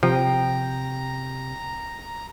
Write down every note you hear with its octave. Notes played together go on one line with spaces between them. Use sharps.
C3 F3 G5 A#5